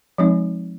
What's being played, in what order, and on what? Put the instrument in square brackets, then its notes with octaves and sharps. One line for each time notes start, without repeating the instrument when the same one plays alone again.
[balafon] F3 G#3 C4 D#4